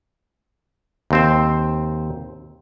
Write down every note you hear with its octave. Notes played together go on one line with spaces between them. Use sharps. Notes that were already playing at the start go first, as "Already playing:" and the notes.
D#2 C4 C5